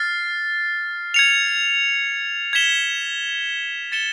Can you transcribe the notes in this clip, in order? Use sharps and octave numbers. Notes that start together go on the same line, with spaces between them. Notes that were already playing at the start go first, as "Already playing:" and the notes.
Already playing: F6 A6 C7
G#6 C#7 F7
G#6 B6 E7 G7
A6 C#7 E7 G7